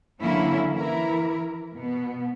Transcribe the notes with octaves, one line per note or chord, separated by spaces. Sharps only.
D3 E3 F#3 A#3 C#4 E4
E3 E4 A#4
B2 B3